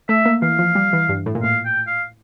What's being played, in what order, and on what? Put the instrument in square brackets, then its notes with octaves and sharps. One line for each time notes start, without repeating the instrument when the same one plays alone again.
[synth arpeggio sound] A3 [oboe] E5
[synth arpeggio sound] A#3
[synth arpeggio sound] E3 [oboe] F5
[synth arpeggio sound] F3
G3
E3
G2
A2
A#2
[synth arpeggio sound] A2 [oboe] F5
[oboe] G5
F5